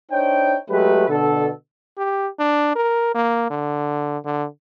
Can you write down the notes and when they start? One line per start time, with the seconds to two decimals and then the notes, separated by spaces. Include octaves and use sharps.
0.11 D4 D#4 C5 C#5 G5
0.69 F#3 G#3 A3 G4 B4
1.09 B2 D3 A4
1.98 G4
2.39 D4
2.76 A#4
3.15 A#3
3.50 D3
4.25 D3